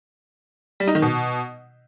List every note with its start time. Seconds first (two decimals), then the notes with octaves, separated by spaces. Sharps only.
0.80 G3
0.87 D#4
0.95 D#3
1.02 B2